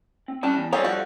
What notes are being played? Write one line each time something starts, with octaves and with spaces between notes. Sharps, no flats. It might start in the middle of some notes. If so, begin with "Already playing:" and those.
C4
G3 C#4 A5
E2
G3 C4 G#4 A4 C#5 F5
F3 F#4